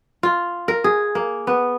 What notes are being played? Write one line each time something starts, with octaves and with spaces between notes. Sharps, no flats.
F4
A#4
G#4
A#3
B3